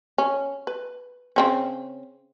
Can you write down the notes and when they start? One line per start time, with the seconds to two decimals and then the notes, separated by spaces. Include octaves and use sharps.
0.18 C#4
0.67 B4
1.36 C#3 C4 C#4